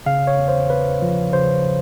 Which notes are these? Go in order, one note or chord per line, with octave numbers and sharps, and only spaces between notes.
C#3 F5
C#5
E2
C5
E2 B4
F3
C#3 C5